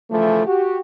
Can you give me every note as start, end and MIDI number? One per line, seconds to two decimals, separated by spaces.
0.10 0.45 49
0.10 0.45 52
0.10 0.45 53
0.10 0.45 57
0.46 0.79 66
0.46 0.79 67